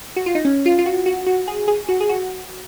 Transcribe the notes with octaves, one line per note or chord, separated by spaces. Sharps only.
F#4
F4
D#4
C#4
F4
F4
F#4
F#4
F#4
G#4
G#4
F#4
G#4
F#4